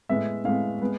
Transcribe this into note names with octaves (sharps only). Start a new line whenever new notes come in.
A2 G#3 B3 E5
A2 G#3 B3 F5
G#3 B3